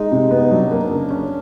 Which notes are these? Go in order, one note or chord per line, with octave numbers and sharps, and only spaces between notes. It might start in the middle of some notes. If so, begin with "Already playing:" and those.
Already playing: G#3 D#4
C3
B3
F#3 D4
A#3
C#3
C#4